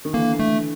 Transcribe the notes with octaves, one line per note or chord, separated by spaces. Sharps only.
D#3
D3 E3 A#3
A3